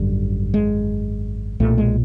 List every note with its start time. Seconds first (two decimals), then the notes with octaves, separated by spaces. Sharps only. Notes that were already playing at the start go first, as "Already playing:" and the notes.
Already playing: G#1 F#2 D3 G3
0.54 G#3
1.60 B1 A#2 A3
1.78 G#3